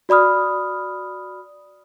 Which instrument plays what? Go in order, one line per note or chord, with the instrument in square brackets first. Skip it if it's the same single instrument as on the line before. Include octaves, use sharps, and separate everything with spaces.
[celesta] F#4 D5 B5 D#6 F6